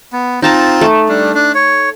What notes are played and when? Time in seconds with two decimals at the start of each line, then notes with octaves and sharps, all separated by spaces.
0.13 B3
0.42 C4 D#4 F4 A5 A#5
0.81 A3
1.09 G3 D4
1.35 D4
1.55 C#5